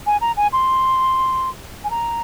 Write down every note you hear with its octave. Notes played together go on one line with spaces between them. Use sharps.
G#5
A#5
G#5
C6
G#5
A#5